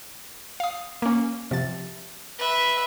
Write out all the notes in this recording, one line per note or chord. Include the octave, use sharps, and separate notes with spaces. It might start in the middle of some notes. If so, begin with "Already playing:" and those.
F5 D#6
A#3 C#4
C3 F3 A6
B4 E5